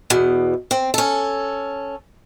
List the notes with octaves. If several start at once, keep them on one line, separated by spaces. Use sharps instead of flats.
E2 B2
C4
C#4 A4